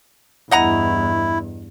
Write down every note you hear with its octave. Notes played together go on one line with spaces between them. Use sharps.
E2 G2 E4 D#5 F#5 A#5